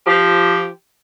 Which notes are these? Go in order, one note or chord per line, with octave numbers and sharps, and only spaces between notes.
F3 G4